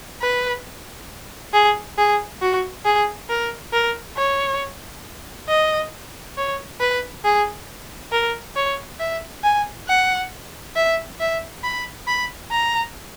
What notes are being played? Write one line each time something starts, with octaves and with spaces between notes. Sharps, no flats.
B4
G#4
G#4
F#4
G#4
A#4
A#4
C#5
D#5
C#5
B4
G#4
A#4
C#5
E5
G#5
F#5
E5
E5
B5
B5
A#5